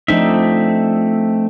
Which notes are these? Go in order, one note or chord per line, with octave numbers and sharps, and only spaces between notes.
F3 A3 C4 D4 D#4 E5